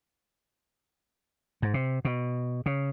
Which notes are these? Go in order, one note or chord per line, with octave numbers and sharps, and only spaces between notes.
G#2
C3
B2
C#3